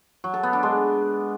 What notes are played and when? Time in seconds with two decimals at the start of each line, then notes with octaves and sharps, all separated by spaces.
0.24 F#3
0.34 A4
0.43 B3
0.53 D4
0.63 G#3